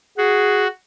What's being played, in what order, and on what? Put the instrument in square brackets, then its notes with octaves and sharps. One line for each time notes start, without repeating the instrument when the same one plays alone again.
[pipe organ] F#4 [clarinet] G#4